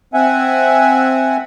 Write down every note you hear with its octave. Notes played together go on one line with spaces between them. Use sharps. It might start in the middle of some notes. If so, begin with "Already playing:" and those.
C4 E5 F#5 G#5